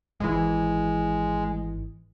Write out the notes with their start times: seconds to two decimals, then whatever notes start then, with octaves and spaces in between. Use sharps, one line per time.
0.20 G#1 E3 G#3